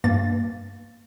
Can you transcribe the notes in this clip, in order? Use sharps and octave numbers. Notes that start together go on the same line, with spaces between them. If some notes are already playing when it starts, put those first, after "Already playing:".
G2 A#3 A6